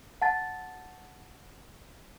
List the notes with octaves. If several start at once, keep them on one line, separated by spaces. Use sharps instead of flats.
F#5 A5 A6